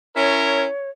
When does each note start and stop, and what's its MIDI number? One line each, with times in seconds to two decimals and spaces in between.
0.16 0.66 61
0.16 0.66 64
0.16 0.66 70
0.16 0.90 73